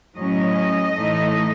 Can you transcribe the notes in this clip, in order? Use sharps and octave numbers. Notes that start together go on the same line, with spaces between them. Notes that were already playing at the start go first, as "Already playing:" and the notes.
A2 F#3 C#4 D#5
A2 E3 A3 D#4